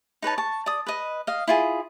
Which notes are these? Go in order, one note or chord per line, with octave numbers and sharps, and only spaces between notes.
D#4 B4 C#5 A5
A5 C#6
D5 D#6
B4 D#5
D#5 F5
E4 F4 G#4